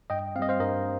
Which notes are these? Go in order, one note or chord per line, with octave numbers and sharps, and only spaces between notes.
G2 D#5 G5
G3 C4 D#5 F5
C5 F5
G2 A#4 D#5